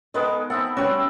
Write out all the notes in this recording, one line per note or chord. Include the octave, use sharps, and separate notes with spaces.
D#3 G#3 B3 A4 B4 D#5
C4 E4 A4 F#5
G3 C4 C#4 F#4 G4 B4